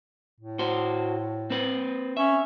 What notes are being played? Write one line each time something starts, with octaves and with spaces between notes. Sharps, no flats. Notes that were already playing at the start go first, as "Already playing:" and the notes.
A2
F#4 C5
C4 B4
C#4 E5